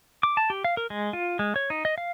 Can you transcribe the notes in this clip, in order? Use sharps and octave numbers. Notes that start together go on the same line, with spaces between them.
D6
A5
G4
F5
A#4
G#3
F4
G#3
C#5
D#4
D#5
F5